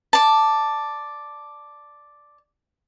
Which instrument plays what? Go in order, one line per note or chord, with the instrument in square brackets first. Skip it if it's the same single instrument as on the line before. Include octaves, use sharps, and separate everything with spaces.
[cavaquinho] D5 A5